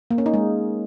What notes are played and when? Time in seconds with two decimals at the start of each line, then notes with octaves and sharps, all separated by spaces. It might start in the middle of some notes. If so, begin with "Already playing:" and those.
0.11 A#3
0.18 C#4
0.26 D#4
0.34 G#3